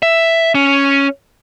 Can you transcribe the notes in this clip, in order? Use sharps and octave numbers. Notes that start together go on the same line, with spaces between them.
E5
C#4